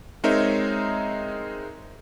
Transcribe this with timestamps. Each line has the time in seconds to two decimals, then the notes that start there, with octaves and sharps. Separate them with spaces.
0.24 G#3 C4 D#4 A#4 C#5 E5